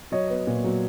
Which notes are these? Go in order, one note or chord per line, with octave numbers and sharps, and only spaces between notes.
F#3 C#5 D#5
B3
A#2
F#3